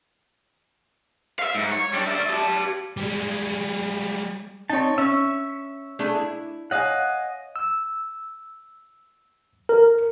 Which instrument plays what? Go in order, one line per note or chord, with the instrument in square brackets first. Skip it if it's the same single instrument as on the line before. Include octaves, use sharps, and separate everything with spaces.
[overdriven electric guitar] E5 F5
G#2
C#5
G3 D4
D5 E5
G4 A5
[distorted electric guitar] G3 G#3
[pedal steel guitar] C4 A5 [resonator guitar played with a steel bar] D#4 C#5
[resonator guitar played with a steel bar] C#4 [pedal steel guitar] E5 C#6
[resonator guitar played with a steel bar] A3 D4 G#4
E4
[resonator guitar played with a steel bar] C#5 F5 G#5 [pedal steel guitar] D#5 F#5
[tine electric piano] E6
A#4